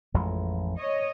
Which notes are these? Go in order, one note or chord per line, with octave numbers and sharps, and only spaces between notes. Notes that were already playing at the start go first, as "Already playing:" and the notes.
A1 F2 G#3
C#5 D#5